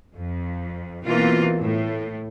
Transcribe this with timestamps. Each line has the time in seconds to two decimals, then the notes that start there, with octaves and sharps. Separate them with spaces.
0.15 F2
1.04 B2 E3 A#3 C4 F4
1.60 A2